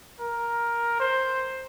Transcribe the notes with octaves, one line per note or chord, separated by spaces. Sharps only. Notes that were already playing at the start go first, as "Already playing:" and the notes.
A#4
C5